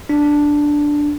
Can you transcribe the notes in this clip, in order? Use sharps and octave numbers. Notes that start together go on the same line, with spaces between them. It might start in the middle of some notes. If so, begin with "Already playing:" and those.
D4